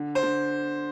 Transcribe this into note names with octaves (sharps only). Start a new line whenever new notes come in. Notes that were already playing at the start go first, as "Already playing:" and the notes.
Already playing: D3
C5
D3